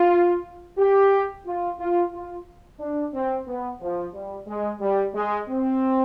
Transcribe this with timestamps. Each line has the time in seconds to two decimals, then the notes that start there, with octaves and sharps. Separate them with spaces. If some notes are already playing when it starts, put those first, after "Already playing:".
Already playing: F4
0.78 G4
1.46 F4
1.79 F4
2.13 F4
2.79 D4
3.13 C4
3.46 B3
3.81 F3
4.14 G3
4.47 G#3
4.80 G3
5.14 G#3
5.49 C4